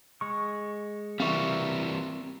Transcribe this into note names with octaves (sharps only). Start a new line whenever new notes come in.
G#3 C#6
E3 G3 C4 A#4 E5 F5 C#6